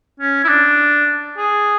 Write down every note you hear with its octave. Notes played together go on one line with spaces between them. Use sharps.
C#4
E4
D4
G#4